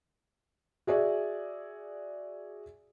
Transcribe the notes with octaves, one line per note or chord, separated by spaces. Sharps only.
F#4 G#4 D5 E5